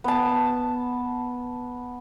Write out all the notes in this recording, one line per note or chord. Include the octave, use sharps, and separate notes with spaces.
B3 A5